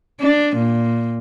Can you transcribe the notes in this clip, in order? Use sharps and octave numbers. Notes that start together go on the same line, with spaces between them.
D4
A#2